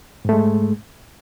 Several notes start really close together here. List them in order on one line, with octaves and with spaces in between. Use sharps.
G#2 A3 G#3